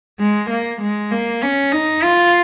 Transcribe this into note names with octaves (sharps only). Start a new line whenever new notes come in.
G#3
A#3
G#3
A#3
C#4
D#4
F4